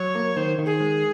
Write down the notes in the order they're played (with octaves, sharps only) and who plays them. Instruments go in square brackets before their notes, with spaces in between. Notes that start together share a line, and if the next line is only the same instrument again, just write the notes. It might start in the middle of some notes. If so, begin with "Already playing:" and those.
Already playing: [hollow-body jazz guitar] F#3 [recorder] C#5
[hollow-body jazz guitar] A#3
[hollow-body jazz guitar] D#3 [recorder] C5
[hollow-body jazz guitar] D#3
[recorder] G#4
[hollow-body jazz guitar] G#3